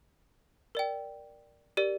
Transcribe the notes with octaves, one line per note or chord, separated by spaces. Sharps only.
A#4 D5 G5
G4 A#4 D5